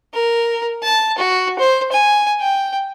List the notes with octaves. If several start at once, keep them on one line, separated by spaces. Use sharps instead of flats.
A#4
A5
F#4
C5
G#5
G5